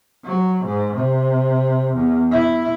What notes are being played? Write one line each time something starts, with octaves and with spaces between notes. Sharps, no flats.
F#3
G#2
C3
E2
E4